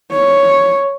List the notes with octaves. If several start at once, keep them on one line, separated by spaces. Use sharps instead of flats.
C#5